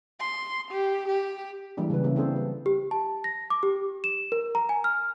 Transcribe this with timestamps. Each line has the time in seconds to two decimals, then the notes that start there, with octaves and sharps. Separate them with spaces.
0.21 C6
0.72 G4
1.09 G4
1.77 E3 G3 G#3 A#3 D4
1.90 C#3 G3 C#4 B4
2.04 C#3 A#3 E4
2.16 C4 D4 G#4 A4 C5
2.36 G3 B4
2.66 G4
2.91 A5
3.24 A#6
3.50 D6
3.63 G4
4.04 E7
4.32 A#4
4.55 A#5
4.69 G#5
4.84 F6